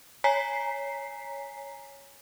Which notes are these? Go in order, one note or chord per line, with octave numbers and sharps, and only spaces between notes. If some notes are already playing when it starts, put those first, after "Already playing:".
C#5 G#5 A#5 B6 C7